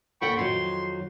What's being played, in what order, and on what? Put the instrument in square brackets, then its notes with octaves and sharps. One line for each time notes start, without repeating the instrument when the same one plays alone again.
[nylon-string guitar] D#2 A4 F#5 [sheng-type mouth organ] G5 B5 C#6
[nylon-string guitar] F2 D#3 F#3 [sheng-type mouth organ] C6